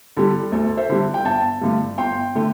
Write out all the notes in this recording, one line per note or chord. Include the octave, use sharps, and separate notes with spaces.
D3 G3 A4
D2 A4
C5 E5
D3 G3
G5
G1 E5 A5
G2 D3 A3
G1 G5 C6
D3 A3